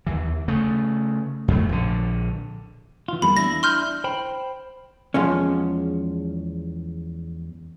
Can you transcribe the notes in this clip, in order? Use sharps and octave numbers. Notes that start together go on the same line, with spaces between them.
D#2 E3
C#3 A3
F2 A3
A#1 D3
E3 F4
E2 G3 A#3 B5
D4 E4 A#6
C6 F6 G6
C5 G5 B5
E2 F3 G#3 C#4